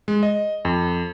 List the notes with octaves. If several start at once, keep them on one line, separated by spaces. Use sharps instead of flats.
G#3
D#5
F2